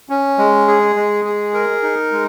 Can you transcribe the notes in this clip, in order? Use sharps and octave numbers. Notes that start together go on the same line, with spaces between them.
C#4
G#3
G#4
G#3
G#4
A#4
D#4
G#3